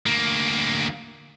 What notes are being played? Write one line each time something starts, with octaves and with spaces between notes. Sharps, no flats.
D2 A#3